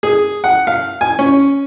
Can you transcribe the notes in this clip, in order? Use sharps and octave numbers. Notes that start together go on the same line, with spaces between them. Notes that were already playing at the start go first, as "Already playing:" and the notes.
G#4
F#5
F5
G#5
C#4